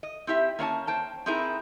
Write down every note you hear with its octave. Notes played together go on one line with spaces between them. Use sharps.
D#5
C4 E4 G4 E5
A#3 C#4 D#5 A5
C5 G5 A5
C4 D#4 E4 G#4 A#4